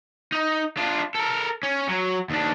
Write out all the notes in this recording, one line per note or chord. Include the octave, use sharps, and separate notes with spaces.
D#4
D4 F4
A4 A#4
C#4
F#3
D#2 D4